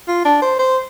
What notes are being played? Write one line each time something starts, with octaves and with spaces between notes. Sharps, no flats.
F4
D4
C5
C5